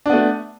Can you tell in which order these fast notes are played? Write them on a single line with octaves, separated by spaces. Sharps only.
D4 B3 A3